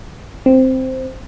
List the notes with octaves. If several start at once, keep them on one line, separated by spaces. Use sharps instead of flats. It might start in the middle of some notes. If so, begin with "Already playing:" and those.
C4